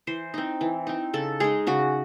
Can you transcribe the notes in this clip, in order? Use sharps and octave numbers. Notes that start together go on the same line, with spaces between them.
E3 C5
C4 D#4
E3
C4 D#4
C#3 A4
G#3 D#4 G#4
C#3 F#4